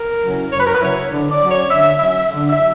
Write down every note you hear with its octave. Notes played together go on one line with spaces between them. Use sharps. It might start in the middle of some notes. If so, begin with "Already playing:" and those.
Already playing: A#4
C#3 F#3 C#4 E4
F#2 C#5
B4
A#4
B4
C#3 F#3 C#4 E4 C#5
D3
D5
F#3 C#4
C#5
D3 E5
F#3 C#4 E5
D3
E5
F#3